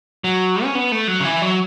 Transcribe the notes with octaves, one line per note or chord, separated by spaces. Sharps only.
F#3
C#4
B3
A3
F#3
C#3
E3
F#3